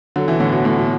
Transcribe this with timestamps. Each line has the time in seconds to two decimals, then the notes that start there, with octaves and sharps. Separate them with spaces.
0.16 D3 F#3
0.28 B2 E3
0.40 A2 D3
0.53 B2
0.65 A2
0.78 B2